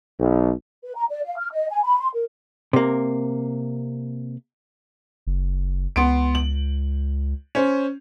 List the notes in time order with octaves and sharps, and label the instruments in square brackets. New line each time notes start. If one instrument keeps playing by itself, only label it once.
[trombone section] B1
[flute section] B4
A#5
D5
F5
F6
D#5
G#5
B5
C6
A#4
[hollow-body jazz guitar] C3 A#3
[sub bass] F#1
[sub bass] C#2 [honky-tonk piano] B3 C6 D7
[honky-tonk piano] F#7
C#4 C5